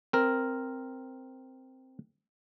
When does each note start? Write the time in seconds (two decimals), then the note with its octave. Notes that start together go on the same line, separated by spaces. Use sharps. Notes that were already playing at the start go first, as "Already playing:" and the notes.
0.13 C4 A#4